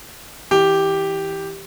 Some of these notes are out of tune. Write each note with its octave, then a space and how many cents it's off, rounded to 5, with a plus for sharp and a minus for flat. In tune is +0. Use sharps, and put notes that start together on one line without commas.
E3 -25 G4 +0